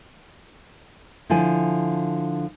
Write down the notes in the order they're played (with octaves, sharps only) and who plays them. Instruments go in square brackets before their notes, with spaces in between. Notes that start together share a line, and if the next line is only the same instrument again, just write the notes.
[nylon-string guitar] D3 F3 E4 G#5